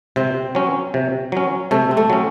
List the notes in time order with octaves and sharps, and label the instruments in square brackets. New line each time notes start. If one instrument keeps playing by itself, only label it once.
[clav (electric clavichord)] C3 [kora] C4
[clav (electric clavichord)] F#3 C#4
C3
F#3 C#4
[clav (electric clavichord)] C3 [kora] A3
[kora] C4
A3
[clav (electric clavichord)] F#3 C#4